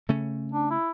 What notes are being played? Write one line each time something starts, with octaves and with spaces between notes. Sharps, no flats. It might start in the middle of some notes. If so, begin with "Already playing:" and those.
C#3 A3 C#4
D4
E4